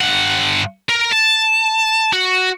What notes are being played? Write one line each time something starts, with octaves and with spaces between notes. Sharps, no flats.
G2 F#5
A#4
A5
F#4